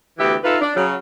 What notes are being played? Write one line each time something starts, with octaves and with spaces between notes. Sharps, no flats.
D2 E3 B3 G4 E5
D#4 F4 A4 B4 E5
D4
C#3 F#3